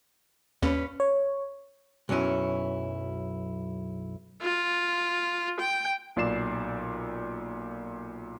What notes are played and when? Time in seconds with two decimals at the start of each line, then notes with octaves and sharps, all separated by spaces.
0.62 D#2 C#4 B4
1.00 C#5
2.09 B1 F#2 F#3 C#4 E4
4.42 F4
5.60 G5
6.16 B1 A#2 D5 C7 E7